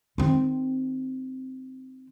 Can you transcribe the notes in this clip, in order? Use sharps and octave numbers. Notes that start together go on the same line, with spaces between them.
D#3 C4